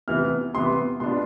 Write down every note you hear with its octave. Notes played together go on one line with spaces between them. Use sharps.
C3 E3 B3 F6
C3 E3 B3 C6
B2 B3 D4 F4 C6